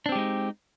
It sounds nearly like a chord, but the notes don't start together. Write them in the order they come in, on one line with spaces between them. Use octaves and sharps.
D4 C4 G4 G#3 D#4